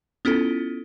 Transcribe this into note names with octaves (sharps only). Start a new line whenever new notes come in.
B3 C#4 E4 F4 A4